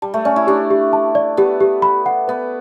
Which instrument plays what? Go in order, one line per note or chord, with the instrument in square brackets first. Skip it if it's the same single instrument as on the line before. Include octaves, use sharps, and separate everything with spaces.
[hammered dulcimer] G3 [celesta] A5
[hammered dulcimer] A3
[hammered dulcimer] C#4 [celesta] D5
[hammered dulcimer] E4
[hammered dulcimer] D4 [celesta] G4
[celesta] G4
A5
D5
[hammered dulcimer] B3 [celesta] G4
[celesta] G4
B5
F#5
[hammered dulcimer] B3 [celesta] B4